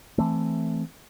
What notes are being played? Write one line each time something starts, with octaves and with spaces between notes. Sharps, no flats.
E3 A3 C4